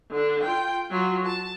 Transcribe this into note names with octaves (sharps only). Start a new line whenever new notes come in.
D3 D4
F4 G5
F#3 F4
A5